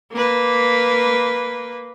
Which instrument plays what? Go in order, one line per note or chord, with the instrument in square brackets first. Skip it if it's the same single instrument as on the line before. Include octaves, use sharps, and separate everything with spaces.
[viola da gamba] A#3 B4